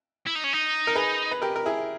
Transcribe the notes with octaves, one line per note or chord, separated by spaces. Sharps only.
E4
D#4
C#4
D#4
A#4
G#4 B4
B4
G4 A#4
A#4
E4 G#4